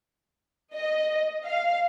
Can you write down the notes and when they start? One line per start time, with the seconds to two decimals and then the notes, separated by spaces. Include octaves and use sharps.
0.73 D#5
1.45 F5